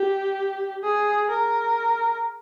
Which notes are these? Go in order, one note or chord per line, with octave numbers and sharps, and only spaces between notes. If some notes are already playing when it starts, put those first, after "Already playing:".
Already playing: G4
G#4
A#4